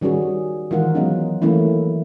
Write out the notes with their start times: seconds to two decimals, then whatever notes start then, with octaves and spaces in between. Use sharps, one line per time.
0.01 D#3 G3 C#4 F#4 G#4
0.71 D#3 E3 G#3 F4 A#4 F#5
0.95 F#3 G#3 B3 C#4 D#4
1.42 E3 A3 A#3 C#4 E4